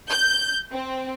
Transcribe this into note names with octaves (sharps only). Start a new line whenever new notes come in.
G6
C4